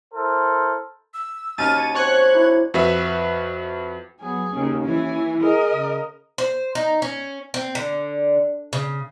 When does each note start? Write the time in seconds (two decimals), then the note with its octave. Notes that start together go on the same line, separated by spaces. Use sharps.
0.13 E4 A4 A#4 C5
1.14 E6
1.58 D#2 C#4 F#4 A#5 F6 A6 D#7
1.76 C#5
1.95 C4 C#5 C#6 F#6 G#6
2.33 D4 E4
2.74 F2 F#4 B4 E5
4.21 F#3 B3 G#4
4.51 D#2 C#3 C#4
4.84 E3 G#5
5.42 G#4 A#4 D#5
5.75 C#3
6.38 C5
6.75 D#4
7.02 C#4
7.54 C4
7.75 D3
8.73 C#3